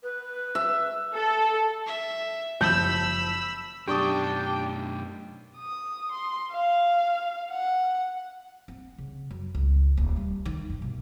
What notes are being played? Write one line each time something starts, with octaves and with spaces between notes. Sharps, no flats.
B4
E5
A4
E5
F#1 F3 A5 B5 E6 G6
F#2 B2 D4 G4 G5 C#6 D#6
D#6
C6
F5
F#5
C4
C#3
F#2
C#2
D#1
G3
D#3
G2
B2